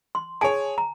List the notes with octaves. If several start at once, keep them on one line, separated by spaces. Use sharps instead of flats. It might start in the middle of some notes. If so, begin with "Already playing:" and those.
C6
G#4 C#5 G#5 A5
A#5